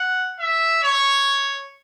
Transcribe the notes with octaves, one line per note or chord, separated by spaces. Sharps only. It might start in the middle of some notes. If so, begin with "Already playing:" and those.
Already playing: F#5
E5
C#5